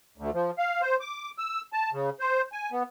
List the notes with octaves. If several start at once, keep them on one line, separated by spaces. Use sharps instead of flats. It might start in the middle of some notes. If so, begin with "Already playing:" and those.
D2
F3
F5
C5
D6
E6
A5
C#3
C5
G#5
B3